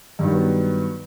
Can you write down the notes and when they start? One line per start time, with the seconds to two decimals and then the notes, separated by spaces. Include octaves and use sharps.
0.19 G2
0.23 D#3
0.27 F#3
0.31 B3